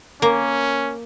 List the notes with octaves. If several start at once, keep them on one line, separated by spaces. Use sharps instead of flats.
A#3 C#4